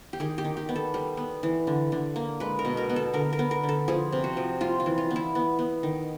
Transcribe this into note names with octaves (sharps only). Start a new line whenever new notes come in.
G4
D#3 G#4
G4
D#3
G4
B3
A4
G3
B3
E3
D3
D3
A#3
G#3 B4
A#4
B2
A#4
B3
A4
D3 A#4
A#4
B3
A#4
D3
A4
F3 G#4
C3
F#4
F3
G3 F4
F4
E3
F4
B3
E4
B3
B3
D#3